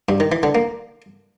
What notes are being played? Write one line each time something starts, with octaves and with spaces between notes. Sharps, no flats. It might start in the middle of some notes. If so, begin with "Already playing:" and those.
G2
D#3
E3
D3
A#3